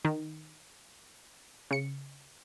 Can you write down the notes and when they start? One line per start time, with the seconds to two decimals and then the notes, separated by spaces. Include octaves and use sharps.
0.05 D#3
1.71 C#3 C#7